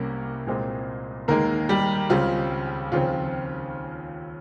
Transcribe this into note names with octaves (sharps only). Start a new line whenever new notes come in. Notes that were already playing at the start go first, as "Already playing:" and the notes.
Already playing: C2 C3 G3 A#3 C#4 A#4
C2 A#2 G#3 C4
D#2 D#3 G#3 A#3 A#4
G3 G4
C#2 C#3 G3 C4 F4
D#2 C#3 F3 C4 F4